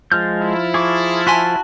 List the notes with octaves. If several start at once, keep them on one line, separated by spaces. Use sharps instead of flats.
F3 G#3 F4 F6 G6
E4
G#4 C#6 D6
F#4 G#5 A5 C6 B6